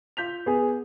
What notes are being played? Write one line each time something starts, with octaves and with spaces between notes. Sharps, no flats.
F4 G6 B6 F7
B3 G#4 G#5